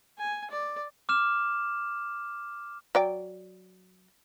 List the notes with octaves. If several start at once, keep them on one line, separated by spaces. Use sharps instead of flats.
G#5
D5
D6 F6 E7
F#3 D5 G5